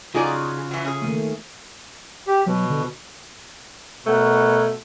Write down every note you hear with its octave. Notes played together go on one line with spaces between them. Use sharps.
C#3 D#4 F4 F#4 G#4 D5
E3 F#3
C#4 G#4
D#3 A3 A#3
G4
B2 F#3
D3
B2 A3 A#4 C#5 F#5